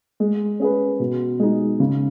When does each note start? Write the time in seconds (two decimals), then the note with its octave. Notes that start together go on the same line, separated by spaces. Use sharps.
0.20 G#3
0.60 C#4 G#4 B4
1.00 B2
1.39 G#3 D#4
1.80 C#3